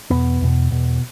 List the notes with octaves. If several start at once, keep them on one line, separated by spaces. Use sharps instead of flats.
E2 B2 B3
E2 B2
E2 B2